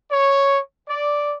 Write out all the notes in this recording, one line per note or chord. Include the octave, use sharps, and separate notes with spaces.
C#5
D5